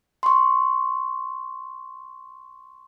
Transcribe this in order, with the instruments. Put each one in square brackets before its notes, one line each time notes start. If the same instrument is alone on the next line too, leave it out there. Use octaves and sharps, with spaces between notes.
[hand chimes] C6 C#6